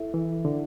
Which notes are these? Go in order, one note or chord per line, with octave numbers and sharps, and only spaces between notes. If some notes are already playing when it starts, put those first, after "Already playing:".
Already playing: E4 A4 E5
E3
D3